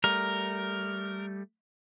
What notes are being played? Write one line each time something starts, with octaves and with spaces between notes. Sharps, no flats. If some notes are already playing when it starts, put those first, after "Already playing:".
G3 A3 A#4